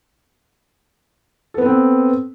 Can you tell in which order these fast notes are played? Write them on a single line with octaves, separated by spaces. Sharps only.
A4 B3 B4 C4